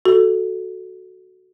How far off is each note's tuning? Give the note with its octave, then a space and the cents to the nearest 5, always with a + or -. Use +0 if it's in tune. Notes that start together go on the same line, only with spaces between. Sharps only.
F#4 +0 A4 -10